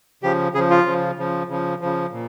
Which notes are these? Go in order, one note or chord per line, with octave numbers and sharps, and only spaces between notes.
C#3 F3 G4
C#3 F3 G#4
F4
C#3 F3
C#3 F3
C#3 F3
C#3 F3
A#2